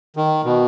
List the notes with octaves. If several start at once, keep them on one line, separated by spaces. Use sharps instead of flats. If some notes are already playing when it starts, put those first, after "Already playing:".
D#3
B2